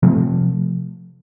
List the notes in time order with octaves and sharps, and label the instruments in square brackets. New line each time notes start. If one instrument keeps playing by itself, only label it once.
[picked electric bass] C3 F3 A3